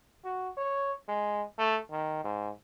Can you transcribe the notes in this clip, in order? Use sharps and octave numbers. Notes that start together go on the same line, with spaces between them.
F#4
C#5
G#3
A3
D#3
G#2